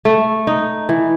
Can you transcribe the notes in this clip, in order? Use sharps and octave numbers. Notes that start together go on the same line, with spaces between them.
A3
D#4
E3